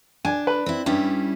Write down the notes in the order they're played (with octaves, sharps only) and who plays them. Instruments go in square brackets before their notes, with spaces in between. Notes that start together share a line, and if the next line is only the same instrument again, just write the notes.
[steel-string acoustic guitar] D4 [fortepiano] G#5
[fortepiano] B4
[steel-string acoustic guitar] C4 E4
[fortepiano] G2 [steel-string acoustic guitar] G3 C#4 E4